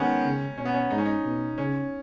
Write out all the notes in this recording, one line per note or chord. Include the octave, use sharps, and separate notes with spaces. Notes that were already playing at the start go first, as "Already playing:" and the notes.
Already playing: D#3 G#3 B3 C#4
C#3
B2 C#4
B3
C#4
G#2 D#4
C#4
D#4
B2
C#3 C#4